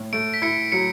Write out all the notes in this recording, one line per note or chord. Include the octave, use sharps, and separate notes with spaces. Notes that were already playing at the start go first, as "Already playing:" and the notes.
Already playing: A2
A3 D7
B6
E4 C#7
F#3 C#7